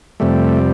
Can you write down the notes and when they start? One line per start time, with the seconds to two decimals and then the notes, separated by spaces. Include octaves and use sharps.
0.20 F2 C3 G3 A3